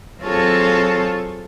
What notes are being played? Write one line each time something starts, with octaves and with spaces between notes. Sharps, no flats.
F#3 C4 F4 G#4 A4 C#5